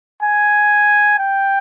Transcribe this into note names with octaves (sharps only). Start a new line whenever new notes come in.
G#5
G5